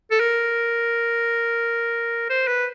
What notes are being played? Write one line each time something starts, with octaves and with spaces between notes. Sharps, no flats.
A4
A#4
C5
B4